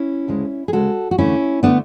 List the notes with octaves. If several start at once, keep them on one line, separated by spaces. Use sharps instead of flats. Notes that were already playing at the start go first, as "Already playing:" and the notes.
Already playing: C#4 E4
D2 C#3 G#3
G#4
D2 C#3 G#3 F#4 A4
F#4
E2 D3 A3 C#4 E4
D3 A3 B3 D4